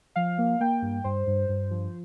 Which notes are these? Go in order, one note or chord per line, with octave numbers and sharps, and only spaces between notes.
F3 F5
A#3
A#3 G5
G2
G2 C5
G2
G2
F3